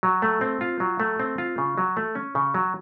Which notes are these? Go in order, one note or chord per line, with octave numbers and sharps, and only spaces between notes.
F#3
A3
C4
F4
F#3
A3
C4
F4
C#3
F#3
A3
C#4
C#3
F#3